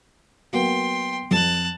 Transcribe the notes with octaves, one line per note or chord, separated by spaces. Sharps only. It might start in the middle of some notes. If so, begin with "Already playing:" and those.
F#3 A#3 B3 G5 C6
F2 A5 F#6